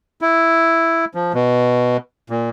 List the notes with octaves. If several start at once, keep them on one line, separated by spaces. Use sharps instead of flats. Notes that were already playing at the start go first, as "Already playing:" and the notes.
E4
F3
B2
A#2